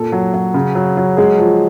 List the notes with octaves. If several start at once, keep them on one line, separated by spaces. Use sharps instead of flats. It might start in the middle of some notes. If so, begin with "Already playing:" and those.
Already playing: A#2 A4
F#3
F#3
C#3
F#3
F#3
G#3 G#4
F3